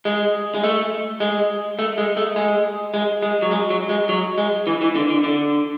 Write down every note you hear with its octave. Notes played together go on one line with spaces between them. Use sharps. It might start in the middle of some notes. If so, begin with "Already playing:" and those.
G#3
G#3
A3
G#3
A3
G#3
A3
G#3
G#3
G#3
F#3
G#3
F#3
G#3
F#3
G#3
E3
E3
D3
D3
D3